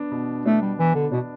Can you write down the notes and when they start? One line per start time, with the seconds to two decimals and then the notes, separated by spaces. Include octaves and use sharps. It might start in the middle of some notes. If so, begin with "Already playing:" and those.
Already playing: B3 D4
0.11 B2
0.46 A3 D4
0.61 G3
0.78 E3 B3
0.95 D3
1.12 B2 D4